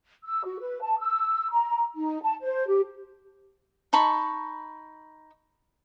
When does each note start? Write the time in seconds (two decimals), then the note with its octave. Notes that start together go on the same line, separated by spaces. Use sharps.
0.24 E6
0.44 F#4
0.60 B4
0.81 A5
1.00 E6
1.51 A#5
1.95 D#4
2.23 A5
2.42 C5
2.66 G4
3.93 D#4 A5 B5 C#6